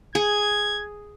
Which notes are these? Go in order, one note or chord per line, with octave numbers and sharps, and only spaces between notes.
G#4 G#6